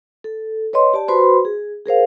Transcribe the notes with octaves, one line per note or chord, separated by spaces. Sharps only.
A4
B4 C#5 D#5 C6
G4 D5 A5
F#4 B4 C5 B5 C6
G#4
G#4 A#4 C5 F5